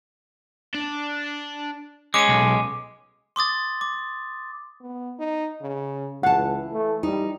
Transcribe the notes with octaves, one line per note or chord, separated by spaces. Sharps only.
D4
G#3 C#4 D6 D#7
B1
C6 D6 D#6 A6
D6
B3
D#4
C#3
C#2 E3 F5 F#5 A5
A3
G3 D#4